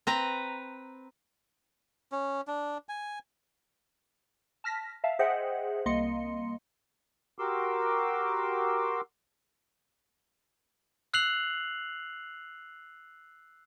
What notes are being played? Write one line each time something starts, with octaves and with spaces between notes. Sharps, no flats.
C4 B4 A#5
C#4
D4
G#5
A5 F6 A#6 B6
E5 F5 A5
G#4 C5 D#5 E5 F#5 G5
C2 A#3 D#5 C6 C#7
F#4 G4 A#4 C6 D6 E6
E6 F#6 C7 F7 F#7